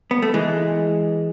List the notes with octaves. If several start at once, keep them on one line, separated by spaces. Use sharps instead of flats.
B3
A3
E3 G#3